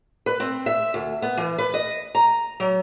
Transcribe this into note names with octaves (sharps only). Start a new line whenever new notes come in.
B4
C4
E5
D2
B3
E3
B4
D#5
A#5
F#3